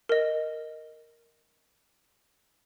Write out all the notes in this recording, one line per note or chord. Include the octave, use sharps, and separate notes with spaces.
A#4 D#5